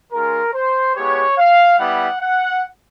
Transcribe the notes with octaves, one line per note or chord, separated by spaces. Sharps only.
G#3 C#4 F4 A#4
C5
G#3 B3 E4 G4 C#5
F5
G3 B3 E4 G4 F#5
F#5